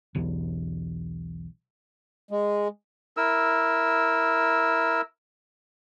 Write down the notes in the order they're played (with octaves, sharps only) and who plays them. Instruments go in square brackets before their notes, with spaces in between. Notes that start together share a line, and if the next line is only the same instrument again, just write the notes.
[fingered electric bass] B1 E2
[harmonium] G#3
[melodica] E4 A#4 E6